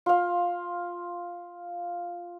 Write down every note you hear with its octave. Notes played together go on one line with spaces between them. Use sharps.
F4 F5